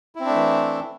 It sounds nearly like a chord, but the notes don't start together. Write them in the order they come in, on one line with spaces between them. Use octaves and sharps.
E4 C4 D4 A3 E3